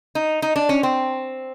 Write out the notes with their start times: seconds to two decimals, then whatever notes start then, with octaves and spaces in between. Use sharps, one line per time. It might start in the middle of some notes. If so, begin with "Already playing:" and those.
0.15 D#4
0.42 D#4
0.56 D4
0.69 C#4
0.83 C4